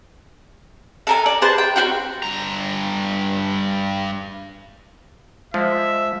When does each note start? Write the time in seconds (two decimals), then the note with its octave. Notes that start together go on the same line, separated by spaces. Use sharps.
1.07 A4 A#4 G#5
1.26 D5
1.42 G#4 B4 C5 A5
1.58 G5
1.76 C4 F4 F#4 G5
2.23 G2 A#5
5.54 F3 G#3 E5